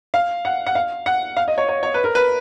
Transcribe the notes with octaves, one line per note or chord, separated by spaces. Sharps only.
F5
F#5
F#5
F5
F#5
F5
D#5
C#5
C#5
C#5
B4
A#4
B4